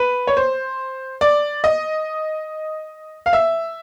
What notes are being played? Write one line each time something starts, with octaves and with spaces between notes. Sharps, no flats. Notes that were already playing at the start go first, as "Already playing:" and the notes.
Already playing: B4
C#5
C5
D5
D#5
F5
E5